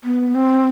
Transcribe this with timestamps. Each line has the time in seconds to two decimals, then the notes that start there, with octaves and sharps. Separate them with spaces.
0.04 B3
0.35 C4